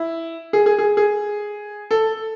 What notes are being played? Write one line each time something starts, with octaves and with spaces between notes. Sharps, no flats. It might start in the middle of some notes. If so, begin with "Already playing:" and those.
Already playing: E4
G#4
G#4
G#4
G#4
A4